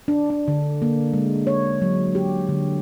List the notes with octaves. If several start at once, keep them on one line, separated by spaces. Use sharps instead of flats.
D4
D4
D3
A#3
G#3
C#5
F#3
G4
D3